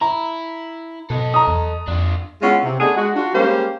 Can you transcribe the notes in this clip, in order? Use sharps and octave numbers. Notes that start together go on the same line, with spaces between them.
E4 A#5
B2 A4 D#5
A#5 D#6
E2
F2 D4 F4
G#3 B3 C#4 E4 F4
C3
A3 B3 D4 D#4 G#4
G#3 F#4
D4 F4 F#4
G3 G#3 A#3 C#4 G4 C5